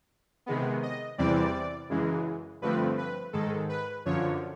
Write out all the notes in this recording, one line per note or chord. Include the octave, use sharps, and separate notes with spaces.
C3 D#3 G#3 B3
D#5
E2 C3 E3 G3 C4 D5
F#2 C#3 E3 G#3
G2 D3 F3 A3 C4 B4
B4
G#2 D#3 G#3 A4
B4
F#2 D3 F3 C#5